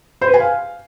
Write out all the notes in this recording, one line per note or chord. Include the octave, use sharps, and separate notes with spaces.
C5
B4
G#5
F5